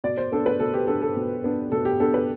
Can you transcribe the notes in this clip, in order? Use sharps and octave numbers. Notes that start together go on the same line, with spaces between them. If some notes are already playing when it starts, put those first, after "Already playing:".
B2 D5
C5
B3 D4 A4
B4
B2 A4
G4
B3 D4 A4
A4
B2
B3 D4
B2 A4
G4
B3 D4 A4
B4